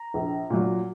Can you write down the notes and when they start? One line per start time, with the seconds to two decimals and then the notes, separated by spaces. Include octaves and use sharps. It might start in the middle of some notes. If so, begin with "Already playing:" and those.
Already playing: A#5
0.14 A#1
0.50 A#2 F#3